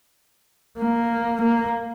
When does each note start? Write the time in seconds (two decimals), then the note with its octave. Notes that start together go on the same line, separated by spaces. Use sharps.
0.78 A#3
1.40 A#3